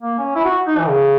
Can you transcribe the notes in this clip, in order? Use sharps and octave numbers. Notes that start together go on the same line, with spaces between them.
A#3
C#4
E4
F#4
D#4
E3
C#3